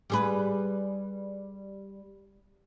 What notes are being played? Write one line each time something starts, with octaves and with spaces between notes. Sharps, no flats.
G3 G#4 B4